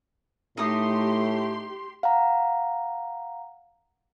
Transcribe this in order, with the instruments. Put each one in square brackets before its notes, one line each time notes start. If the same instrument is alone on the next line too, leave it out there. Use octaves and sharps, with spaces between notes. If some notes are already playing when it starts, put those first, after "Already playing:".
[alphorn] A2 [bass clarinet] A3 [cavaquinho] D#4 D#6 [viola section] G4 C6
[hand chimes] F5 F#5 A#5